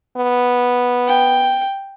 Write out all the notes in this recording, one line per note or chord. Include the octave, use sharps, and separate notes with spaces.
B3
G5